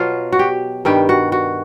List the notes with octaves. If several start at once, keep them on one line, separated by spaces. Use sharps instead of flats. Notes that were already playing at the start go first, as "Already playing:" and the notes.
Already playing: B2 F#3 F4
F#4
G4
G2 D#3 G3 G4
F#4
F#4